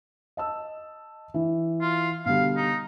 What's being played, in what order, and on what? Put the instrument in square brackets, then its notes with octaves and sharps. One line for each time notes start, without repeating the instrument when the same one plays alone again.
[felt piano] D#5 A5 E6
E3
[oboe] F4
[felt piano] B2 D3 G3 [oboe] F5
[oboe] D#4